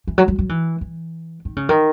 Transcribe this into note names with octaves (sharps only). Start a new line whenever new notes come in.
E3
F#3
F#3
F#3
E3
E3
D#3
C#3
D#3